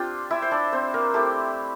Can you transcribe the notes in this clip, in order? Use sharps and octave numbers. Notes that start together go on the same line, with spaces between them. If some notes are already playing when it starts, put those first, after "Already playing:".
Already playing: C4 D4 F4 G4 G5
E4 E5
C5
D4 D5
C4 C5
A#3 A#4
A3 E4 G4